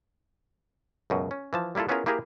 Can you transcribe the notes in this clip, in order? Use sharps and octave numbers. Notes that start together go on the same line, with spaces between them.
C#2 F#2 B2
C#4
E3 F3 A5
G3 A#3 E4 F4 A4
B3 C#4 E4 F4 G#4 A#4
A#3 E4 G4 G#4 A#4